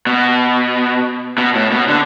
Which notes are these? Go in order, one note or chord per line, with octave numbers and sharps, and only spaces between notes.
B2
B2
A2
B2
D3